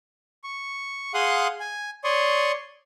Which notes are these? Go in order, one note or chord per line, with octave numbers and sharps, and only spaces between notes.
C#6
G#4 F5 F#5 C6 D#6 F#6
G#5
C#5 D5 C6 C#6 D#6